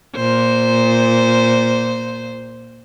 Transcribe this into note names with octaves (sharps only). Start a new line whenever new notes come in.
A#2 C5